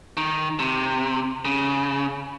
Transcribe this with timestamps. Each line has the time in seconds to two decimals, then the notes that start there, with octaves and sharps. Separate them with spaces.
0.17 D#3
0.59 C3
1.45 C#3